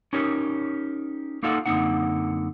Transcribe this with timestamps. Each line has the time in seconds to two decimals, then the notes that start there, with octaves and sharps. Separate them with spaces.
0.13 C#4 D#4 G4 A#4 C#5
1.43 A#3 D#4 F4 A4 F5 F#5
1.66 F#2 D3 A#3 C4 D#4 F#5